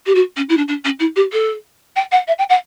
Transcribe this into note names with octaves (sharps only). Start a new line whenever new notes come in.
G4
F#4
C#4
E4
D4
D4
C#4
E4
G4
A4
G5
F#5
E5
G5
F#5